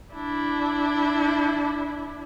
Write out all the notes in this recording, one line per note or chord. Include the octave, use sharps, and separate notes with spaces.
D4 E4